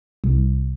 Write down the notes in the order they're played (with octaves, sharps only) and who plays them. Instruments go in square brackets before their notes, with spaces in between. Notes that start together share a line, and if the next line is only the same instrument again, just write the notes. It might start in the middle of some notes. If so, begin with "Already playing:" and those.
[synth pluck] C2